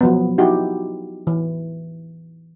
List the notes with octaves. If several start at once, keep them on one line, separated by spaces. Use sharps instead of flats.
F3 F#3 B3
D#4 E4 F#4 G4
E3